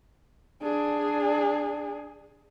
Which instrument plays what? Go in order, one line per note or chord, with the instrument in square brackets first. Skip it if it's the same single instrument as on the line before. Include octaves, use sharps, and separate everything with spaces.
[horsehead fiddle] D4 G#4